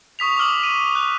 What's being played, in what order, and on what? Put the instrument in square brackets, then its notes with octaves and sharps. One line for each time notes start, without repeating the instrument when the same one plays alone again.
[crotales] C#6 D#6 B6 F7
D6 D#6 F6 F#7
D#7
F#6